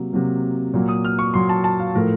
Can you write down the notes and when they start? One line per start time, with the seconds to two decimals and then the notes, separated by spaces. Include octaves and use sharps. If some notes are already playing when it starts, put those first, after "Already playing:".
Already playing: C3 F#3 A#3
0.13 C3 F#3 A#3
0.74 A#2 F#3 A#3
0.89 D#6
1.05 F6
1.19 C#6
1.34 A#2 F#3 A#3 C6
1.49 A5
1.64 A5
1.80 F5
1.94 A2 F3 A3 A#4